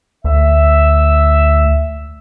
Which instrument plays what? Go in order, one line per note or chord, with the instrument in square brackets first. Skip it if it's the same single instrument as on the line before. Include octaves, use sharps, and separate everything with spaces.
[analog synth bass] D2 [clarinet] E5